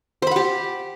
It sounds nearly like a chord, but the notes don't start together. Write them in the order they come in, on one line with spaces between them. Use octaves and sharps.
C5 B5 F#5 G4